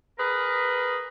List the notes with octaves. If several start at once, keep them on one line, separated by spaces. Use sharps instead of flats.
G#4 A#4 B4